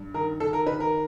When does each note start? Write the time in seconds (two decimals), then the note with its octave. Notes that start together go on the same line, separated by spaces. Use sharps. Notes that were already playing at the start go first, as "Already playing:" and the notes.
Already playing: G2
0.14 D#3 A#4
0.40 D#3 A4
0.53 A#4
0.66 D#3 B4
0.80 A#4